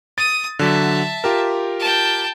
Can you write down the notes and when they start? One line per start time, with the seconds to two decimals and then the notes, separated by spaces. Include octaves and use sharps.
0.18 D#6 A6
0.59 D3 F#3 E5 A5 B6
1.24 F4 G4 A#4
1.80 G5 A5